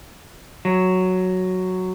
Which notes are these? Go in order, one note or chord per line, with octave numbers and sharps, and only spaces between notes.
F#3